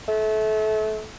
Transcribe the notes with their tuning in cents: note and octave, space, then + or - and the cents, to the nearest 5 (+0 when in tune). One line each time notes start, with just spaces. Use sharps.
A3 -30